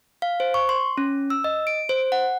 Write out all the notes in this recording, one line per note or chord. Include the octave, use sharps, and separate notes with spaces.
F5
C5
C#6
C6
C#4
E6
D#5
D7
C5
F#5